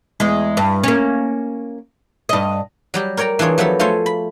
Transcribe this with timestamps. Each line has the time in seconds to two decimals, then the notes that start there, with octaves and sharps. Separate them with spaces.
0.20 E2 G#3
0.57 G2
0.84 A#3 C#4
2.29 G2 D#5
2.94 F#3 G3 G4
3.17 A#4 C#5 D5 G5 A#5
3.39 E3 D4 F4 G#4 C#5
3.58 F3 F#3 A3 B3 A4
3.79 A3 F4 A4 C5 C#5 G#5
4.06 B5